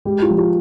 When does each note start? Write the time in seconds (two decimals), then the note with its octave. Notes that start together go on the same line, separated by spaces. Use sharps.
0.05 G#3 G4
0.22 F4
0.30 F3
0.38 F4